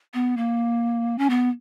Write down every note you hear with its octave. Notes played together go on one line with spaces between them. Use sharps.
B3
A#3
C#4
B3